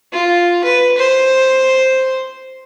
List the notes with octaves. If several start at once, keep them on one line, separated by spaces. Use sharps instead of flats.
F4
B4
C5